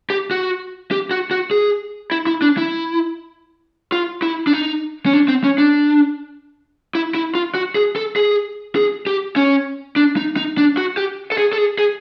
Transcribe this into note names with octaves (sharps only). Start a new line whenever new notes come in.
G4
F#4
G4
F#4
F#4
G#4
E4
E4
D4
E4
F4
E4
D4
D#4
C#4
D4
C4
C#4
D4
E4
E4
F4
F#4
G#4
A4
G#4
G#4
G4
C#4
D4
D#4
D#4
D4
F#4
G4
A4
G#4
A4
G#4
G#4